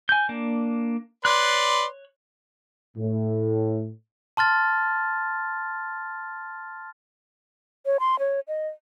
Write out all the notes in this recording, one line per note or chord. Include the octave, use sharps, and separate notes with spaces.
G#5 G6
A#3 D4
B4 C#5 D5 C6 F#6
A2
A5 C6 F6 A6
C#5
C6
C#5
D#5